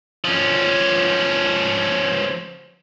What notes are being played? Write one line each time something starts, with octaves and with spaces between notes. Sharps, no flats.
F3 C#4